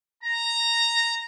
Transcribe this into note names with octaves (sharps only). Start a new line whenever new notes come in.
A#5